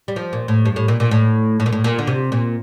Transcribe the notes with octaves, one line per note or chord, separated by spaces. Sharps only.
G3
F3
A#2
A2
G2
A2
A#2
A#2
A2
A2
A#2
A2
A#2
D3
C3
A#2